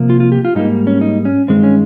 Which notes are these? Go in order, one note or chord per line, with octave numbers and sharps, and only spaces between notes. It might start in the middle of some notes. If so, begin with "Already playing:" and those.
Already playing: C3 F3 A#3
F4
F4
G4
F4
G#2 G3 A#3 D#4
C#4
D#4
C#4
G2 D#3 G#3 C4
C#4